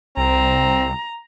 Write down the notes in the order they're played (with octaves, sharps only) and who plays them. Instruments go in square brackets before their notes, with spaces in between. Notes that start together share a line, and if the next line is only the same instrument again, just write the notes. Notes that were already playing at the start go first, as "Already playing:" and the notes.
[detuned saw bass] C2 [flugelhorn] C4 [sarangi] A#5